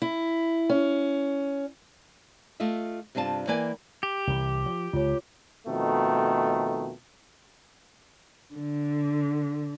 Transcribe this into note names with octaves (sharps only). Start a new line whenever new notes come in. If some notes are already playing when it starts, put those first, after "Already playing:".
E4
C#4
A3 F4 D#5 E5
G2 C3 D4 F4 A5
E3 A#3 B4 D5 G5 G#5
G4
C2 E3
F3
C#2 F4 C#5
F2 B2 D#3 A3
D3